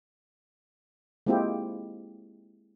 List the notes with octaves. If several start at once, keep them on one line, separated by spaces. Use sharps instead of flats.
G#3 A#3 C4 E4 F4 G4